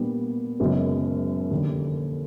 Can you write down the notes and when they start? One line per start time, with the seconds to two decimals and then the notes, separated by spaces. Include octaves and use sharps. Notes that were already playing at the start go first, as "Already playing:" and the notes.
Already playing: A#2 G3 B3 D4
0.60 F#1 F#2 D#3 G#3 B3
1.51 F1 D#2 D3 G3